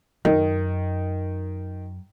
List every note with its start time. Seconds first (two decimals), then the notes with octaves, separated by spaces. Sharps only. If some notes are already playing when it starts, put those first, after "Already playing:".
0.25 F#2 D#3